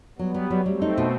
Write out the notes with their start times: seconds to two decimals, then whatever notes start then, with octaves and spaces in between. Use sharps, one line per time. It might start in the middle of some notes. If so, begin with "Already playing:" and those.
0.18 F#3 G3 B3
0.34 F#3
0.50 F#3
0.66 G3 A3 C4
0.82 D#4
0.98 B2